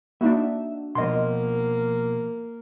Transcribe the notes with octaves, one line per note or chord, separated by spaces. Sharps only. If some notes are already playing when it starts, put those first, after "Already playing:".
A#3 D4 D#4 F#4 E5
B2 F3 A#3 D#5 C6